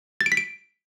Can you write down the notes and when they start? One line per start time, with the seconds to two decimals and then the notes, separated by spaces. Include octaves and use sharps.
0.21 A6
0.26 D7
0.32 B6
0.37 D7